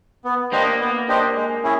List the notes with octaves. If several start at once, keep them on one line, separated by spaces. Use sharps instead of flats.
B3
A#3 D4 G4 C5 D#5
B3
D4 G4 C5 D#5
G#3
C#4 E4 G#4